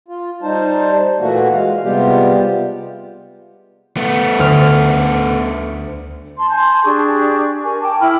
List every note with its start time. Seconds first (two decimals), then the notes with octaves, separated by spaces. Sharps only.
0.08 F4
0.43 G3 D#4 C5 A5
1.20 A#2 E3 A3 A#3 F#4
1.53 G#3 F5
1.84 C3 G3 G#3 B3 F4 G4
3.97 A3 B3
4.39 D2 F6
6.37 A5 C6
6.50 G#5 A5 C6 G6
6.84 D4 G4 G#4 C#6
7.63 A#4 G#5 C#6
7.81 G5 A5 D6
8.00 E4 G5 B5 F6